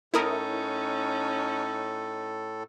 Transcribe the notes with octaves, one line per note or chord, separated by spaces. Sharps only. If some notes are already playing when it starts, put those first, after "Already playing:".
A2 C#4 D#4 E4 A4 A#4 D#6